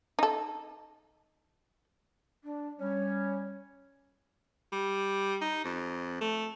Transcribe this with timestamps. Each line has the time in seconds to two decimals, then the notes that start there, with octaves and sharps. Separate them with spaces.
0.19 D#4 A4
2.43 D4
2.80 G3 C#4 C#5
4.72 G3
5.41 D#4
5.65 F2
6.21 A3